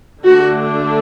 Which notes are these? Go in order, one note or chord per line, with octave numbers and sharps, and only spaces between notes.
D3 A3 D4 F#4